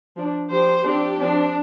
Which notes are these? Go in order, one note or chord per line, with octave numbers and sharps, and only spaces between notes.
F3 D4
F3 D4 G4 C5
F3 C4 D4 G4
F3 C4 D4